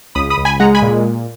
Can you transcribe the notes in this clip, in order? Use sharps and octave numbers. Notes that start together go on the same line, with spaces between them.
C#2 B5 D#6
B5 D#6
C#2
G#5 B5
G#3 F#5 A#5
G#5 B5
A#2